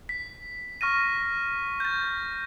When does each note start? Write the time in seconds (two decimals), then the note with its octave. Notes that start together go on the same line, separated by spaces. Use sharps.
0.09 B6
0.81 C#6 F6 A#6 D#7
1.80 G6 A6